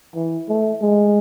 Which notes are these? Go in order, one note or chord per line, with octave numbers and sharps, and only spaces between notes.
E3
A3
G#3